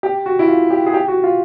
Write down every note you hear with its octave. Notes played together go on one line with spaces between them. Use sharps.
G4
F#4
E4
F4
G4
G#4
G4
F#4
F4